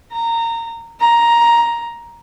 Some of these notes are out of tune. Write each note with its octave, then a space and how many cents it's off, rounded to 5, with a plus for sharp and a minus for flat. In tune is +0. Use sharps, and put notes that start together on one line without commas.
A#5 -20
A#5 +10